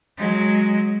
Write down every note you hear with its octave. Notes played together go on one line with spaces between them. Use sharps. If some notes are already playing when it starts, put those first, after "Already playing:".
F#3 G#3